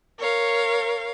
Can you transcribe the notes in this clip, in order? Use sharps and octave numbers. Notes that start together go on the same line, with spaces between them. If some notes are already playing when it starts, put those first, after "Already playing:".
A#4 C#5 F5